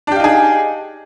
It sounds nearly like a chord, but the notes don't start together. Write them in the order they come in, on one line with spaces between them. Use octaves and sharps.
D4 G4 F5 D#4 G#4